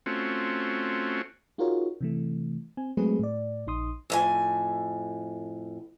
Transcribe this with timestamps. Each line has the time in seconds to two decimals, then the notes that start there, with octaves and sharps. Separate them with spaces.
0.06 A3 C4 C#4 F4 F#4
1.58 D#4 F4 F#4 G#4 A#4 C#5
2.01 C3 E3 A3
2.77 C4 G#5
2.97 F#3 G#3 A3 C4 G#4 B4
3.19 A2 D5
3.67 A#1 D#4 C6 D#6
4.10 F2 A2 G#5